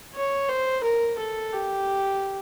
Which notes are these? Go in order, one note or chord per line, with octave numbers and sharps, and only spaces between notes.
C#5
C5
A#4
A4
G4